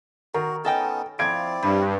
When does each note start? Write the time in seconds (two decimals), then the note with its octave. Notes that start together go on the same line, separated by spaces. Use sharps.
0.34 D#3 F#4 A#4
0.65 B3 C#4 D#4 A4 D#5 G5
1.19 F3 C4 E4 D5 F5 G#6 D7
1.63 G2 G3